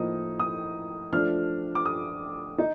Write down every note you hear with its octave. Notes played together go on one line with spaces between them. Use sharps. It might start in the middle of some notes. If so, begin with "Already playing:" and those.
Already playing: A2 F3 A#3 D#4 D#6
D#6
F3 A3 D4 F6
D6
D#6
D#4